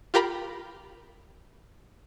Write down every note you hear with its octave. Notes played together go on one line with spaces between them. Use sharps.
F4 G4 A#4 B5